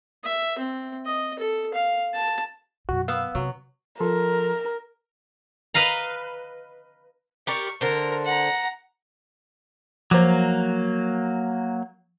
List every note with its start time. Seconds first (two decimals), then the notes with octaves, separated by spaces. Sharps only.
0.24 E5
0.58 C4
1.06 D#5
1.39 A4
1.74 F5
2.14 A5
2.89 F#2 B2 F#4
3.08 B3 F5 E6
3.35 C3 F#3
4.00 F3 A4 A#4 C6
5.74 B4 D#5 F5 A#5
7.47 G4 A#4 D5 C#6
7.81 D3 A#4 C5
8.25 F#5 A#5
10.11 F3 F#3 A#3 C5